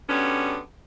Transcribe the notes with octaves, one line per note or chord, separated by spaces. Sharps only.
D3 F#3 G3 B3 C#4